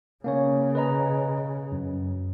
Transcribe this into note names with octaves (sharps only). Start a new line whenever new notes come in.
C#3 A#3 C#4 C#5
B4 D#5 A#5
F#2